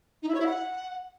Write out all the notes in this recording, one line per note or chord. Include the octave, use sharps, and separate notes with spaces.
D#4
E4
C#5
E4
F#5